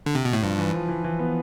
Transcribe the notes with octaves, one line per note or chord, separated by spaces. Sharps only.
D3
C3
B2
A2
G2 F3
E3
F3
E3
E3
B3